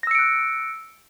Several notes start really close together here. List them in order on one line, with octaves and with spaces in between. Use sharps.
A#6 E6 C#7 D7 F#6